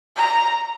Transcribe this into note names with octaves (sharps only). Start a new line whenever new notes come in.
A#5